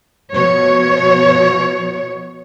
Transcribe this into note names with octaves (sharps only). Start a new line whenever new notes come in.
B2 F3 C#5